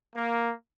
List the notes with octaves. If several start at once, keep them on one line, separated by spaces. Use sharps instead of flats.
A#3